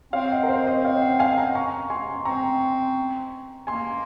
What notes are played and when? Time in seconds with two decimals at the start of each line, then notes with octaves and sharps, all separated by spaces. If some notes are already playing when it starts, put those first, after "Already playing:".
0.13 C4 C#5 F5
0.32 D#5 F#5
0.43 A#4
0.48 C5
0.67 C5 D#5
0.85 C#5 F5
1.02 D#5 F#5
1.19 F5 G#5
1.38 F#5 A#5
1.55 A#5 C#6
1.90 G#5 C6
2.25 C4 A#5 C#6
3.67 A#3 G#5 C6